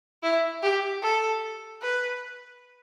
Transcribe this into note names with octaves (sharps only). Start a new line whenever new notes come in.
E4
G4
A4
B4